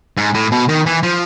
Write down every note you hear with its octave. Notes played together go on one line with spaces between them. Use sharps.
G#2
A2
B2
D#3
E3
F3